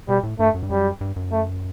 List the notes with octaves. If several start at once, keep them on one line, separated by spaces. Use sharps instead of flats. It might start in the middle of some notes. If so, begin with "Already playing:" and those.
B2 G3
A2
G2 A3
F#2
G2
F#2 G3
G2
F#2
A3